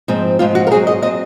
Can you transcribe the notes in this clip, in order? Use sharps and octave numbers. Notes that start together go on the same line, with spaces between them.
G#2 F3 C4
G#2 F3 C4 F4
F#4
A#4
G#2 F#3 C4 G#4
D#5
F#3 C4 D#5